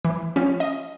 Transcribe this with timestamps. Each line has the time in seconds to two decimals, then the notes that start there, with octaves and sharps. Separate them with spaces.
0.05 E3
0.36 F3 C#4
0.60 D#5